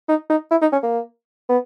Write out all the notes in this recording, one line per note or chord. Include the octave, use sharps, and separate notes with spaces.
D#4
D#4
E4
D#4
C#4
A#3
B3